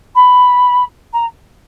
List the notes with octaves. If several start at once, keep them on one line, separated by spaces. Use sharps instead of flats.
B5
A#5